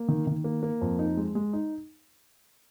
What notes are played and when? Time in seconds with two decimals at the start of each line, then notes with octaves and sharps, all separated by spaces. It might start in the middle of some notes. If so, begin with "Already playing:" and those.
Already playing: A#3
0.08 D#3
0.27 D#3
0.44 A#3
0.63 A#3
0.81 F2
0.99 D#4
1.17 G#3
1.35 G#3
1.53 D#4